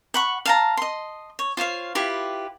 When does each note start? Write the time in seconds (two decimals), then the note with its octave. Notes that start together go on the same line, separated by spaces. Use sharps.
0.14 F#5 B5 C#6
0.46 F5 A5 A#5
0.77 D#5 C6
1.39 C#5
1.57 F4 C5 C#5 F5
1.95 E4 F4 G4 B4